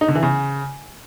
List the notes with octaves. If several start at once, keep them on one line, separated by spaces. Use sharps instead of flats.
D#4
D3
E3
C#3